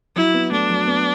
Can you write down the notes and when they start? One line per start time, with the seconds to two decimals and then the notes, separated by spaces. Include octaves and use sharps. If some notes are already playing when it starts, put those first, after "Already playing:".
0.16 F#3 E4
0.34 B3
0.52 A3 D4
0.70 F#3
0.87 B3